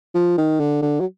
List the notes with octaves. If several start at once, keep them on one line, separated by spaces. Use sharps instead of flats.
F3
D#3
D3
D3
F#3